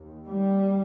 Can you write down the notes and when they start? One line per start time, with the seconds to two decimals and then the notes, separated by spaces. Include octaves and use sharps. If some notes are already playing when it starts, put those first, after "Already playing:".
Already playing: D#2
0.25 G3